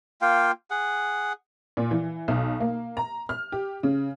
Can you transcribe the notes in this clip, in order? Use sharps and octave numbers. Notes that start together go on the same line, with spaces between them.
A#3 F4 F5 G5
G#4 F#5
A#2
E3
B1
A#3
A#5
F6
G4
C#3